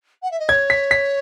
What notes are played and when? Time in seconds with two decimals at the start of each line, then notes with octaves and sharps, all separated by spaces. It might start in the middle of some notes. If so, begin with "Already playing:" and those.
0.22 F#5
0.31 E5
0.39 D#5
0.48 C#5 G#6
0.70 B6
0.91 B6